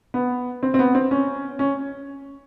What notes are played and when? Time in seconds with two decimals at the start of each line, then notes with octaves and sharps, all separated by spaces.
0.14 B3
0.63 C4
0.74 C4
0.79 B3
0.95 C4
1.11 C#4
1.59 C#4